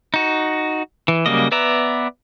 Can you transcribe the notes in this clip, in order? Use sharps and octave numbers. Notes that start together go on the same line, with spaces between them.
D#4 F#4
E3
C#3 F#3 G3 A#3 D#5
B3 B4 D5 E5 A#5